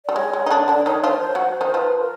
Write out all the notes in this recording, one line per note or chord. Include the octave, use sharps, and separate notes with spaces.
G3 D5
G#3 C#5
G#3
D#4
D3 D4
D3 D4 D5
D#3 D#4 C#5
F3 F4 C5
C#5
C5
F#3 F#4
D#3 D#4
C5
F3 F4 B4
A#4